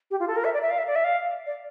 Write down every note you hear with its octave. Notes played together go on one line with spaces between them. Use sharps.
G4
F4
A4
A#4
E5
D5
E5
F5
E5
D5
E5
F5
D5